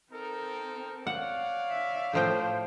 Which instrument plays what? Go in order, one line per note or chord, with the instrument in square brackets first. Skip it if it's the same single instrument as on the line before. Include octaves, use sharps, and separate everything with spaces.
[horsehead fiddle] C4 [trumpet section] D#4 A4 A#4
[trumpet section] C#5 D5 F5 [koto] F#5
[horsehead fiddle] E5
[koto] A2 F3 G5 [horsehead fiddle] C5